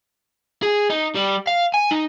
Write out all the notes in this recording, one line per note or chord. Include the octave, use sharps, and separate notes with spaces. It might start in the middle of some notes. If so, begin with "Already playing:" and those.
G#4
D#4
G3
F5
G#5
D#4